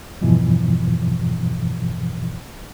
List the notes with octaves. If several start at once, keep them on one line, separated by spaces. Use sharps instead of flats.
E2 G2 B2 E3 F3